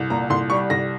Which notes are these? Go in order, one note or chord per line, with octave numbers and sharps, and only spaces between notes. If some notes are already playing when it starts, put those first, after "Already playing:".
Already playing: C2
A#2 A#5
C2 C6
G3 C#6
C2 A#6